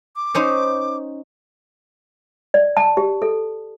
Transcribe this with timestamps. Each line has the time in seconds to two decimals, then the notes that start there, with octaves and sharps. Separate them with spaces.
0.16 D6
0.35 C#4 D#4 C5
2.54 D5
2.77 A5
2.97 G4
3.22 A4